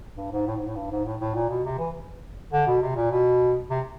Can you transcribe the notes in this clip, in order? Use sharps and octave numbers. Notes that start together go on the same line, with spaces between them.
G2
G#2
A2
G#2
A2
G2
G#2
A2
A2
A#2
B2
C3
E3
D3
B2
C3
A#2
B2
C3